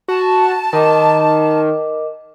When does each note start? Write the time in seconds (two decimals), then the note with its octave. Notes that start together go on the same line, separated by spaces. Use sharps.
0.08 F#4 A5
0.73 D#3 A#4 D#5 D6